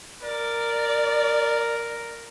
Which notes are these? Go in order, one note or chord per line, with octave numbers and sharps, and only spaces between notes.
A#4 D5